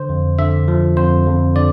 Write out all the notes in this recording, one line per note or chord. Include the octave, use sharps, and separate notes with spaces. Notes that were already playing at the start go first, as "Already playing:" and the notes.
Already playing: D3 C5
F2
D3 E5
F3
F2 C5
F2
D3 D5